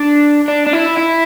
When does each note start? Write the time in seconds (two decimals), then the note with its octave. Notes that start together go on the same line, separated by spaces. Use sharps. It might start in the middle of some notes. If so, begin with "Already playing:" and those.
Already playing: D4
0.48 D4
0.67 D4
0.73 E4
0.97 E4